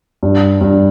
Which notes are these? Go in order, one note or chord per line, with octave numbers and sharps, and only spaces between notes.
G2
G2